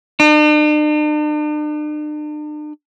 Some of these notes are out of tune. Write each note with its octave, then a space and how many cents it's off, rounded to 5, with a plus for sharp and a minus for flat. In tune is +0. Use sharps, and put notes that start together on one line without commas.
D4 +45